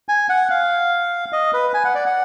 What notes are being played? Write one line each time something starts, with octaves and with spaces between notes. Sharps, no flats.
G#5
F#5
F5
D#5
B4
G#5
F#5
D5
F#5